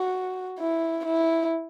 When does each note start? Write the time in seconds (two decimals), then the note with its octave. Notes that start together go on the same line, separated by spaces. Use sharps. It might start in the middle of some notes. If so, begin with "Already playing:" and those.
Already playing: F#4
0.59 E4
1.05 E4